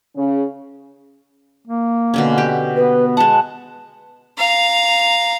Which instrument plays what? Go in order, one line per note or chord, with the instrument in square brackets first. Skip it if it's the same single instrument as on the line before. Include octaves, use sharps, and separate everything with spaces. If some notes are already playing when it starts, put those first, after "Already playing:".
[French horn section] C#3
[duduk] A#3
[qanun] B2 D3 C#4
G4
[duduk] B3 [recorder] B4
[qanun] G#3 F#5 [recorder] A5
[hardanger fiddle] F5 A#5